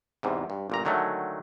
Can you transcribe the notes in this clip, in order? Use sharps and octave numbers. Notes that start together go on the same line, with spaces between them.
E2 G#2 C3
G2
G1 A#2 A#5
D3 D#3 F#3 G#3 A3